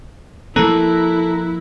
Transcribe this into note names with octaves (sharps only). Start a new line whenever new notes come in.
F3 A#3 E4 A4 A#5 F#6 A#6